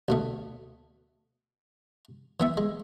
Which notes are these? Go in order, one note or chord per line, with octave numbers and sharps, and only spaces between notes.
D2 B2 A3
E3 B3 E5
G#3